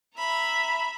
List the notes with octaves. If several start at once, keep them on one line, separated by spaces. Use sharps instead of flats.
E5 A#5 B5